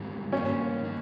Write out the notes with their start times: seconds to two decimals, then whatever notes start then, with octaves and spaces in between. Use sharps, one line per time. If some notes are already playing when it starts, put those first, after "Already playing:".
Already playing: G#2 D#3 G3
0.32 G2 D#3 A#3 C#4 D#4
0.82 D#3 A#3 D#4